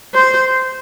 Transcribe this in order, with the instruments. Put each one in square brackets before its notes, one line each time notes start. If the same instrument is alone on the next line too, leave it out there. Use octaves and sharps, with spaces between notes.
[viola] C5